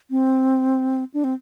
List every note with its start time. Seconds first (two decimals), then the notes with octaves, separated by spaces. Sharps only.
0.11 C4
1.14 D4
1.24 C4